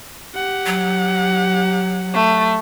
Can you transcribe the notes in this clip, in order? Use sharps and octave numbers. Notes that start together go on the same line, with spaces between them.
G4 F#5
F#3
A3